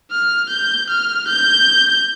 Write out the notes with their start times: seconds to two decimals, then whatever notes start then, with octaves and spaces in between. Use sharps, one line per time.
0.11 F6
0.49 G6
0.89 F6
1.28 G6